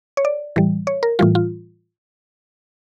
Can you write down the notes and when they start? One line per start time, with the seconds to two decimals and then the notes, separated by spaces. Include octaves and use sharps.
0.17 C#5
0.25 D5
0.56 A2 E3 G3
0.87 C#5
1.03 A#4
1.19 A2 E3 G3 F4
1.35 F4